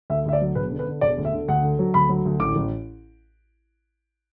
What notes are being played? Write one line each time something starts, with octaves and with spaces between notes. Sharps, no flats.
D2 E5
D2 E5
D5
F#3
E1 B4
D3
B4
D3
E1 D5
D2
E5
D3
D2 F#5
D3
F#3
D2 B5
F#3
D2
A1 D6
A1